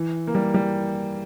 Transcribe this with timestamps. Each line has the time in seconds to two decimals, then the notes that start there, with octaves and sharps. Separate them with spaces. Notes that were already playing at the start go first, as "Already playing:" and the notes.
Already playing: E3
0.27 A#3
0.35 G3
0.54 G3